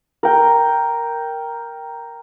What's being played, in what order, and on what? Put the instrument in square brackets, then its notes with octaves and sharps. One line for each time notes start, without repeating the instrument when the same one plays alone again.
[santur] A#4 G5